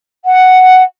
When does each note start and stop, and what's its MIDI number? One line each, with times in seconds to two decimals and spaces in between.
0.24 0.82 78